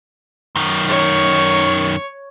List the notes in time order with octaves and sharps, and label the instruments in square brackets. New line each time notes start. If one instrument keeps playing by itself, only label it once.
[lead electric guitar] F#2 D#3
[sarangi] C#5